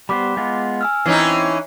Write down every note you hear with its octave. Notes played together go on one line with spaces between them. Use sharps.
G3 B3 C5 B5 D6 B6
G#3 B3 F4
G#5 E6 F6
E3 C4 C#4 D#4 C7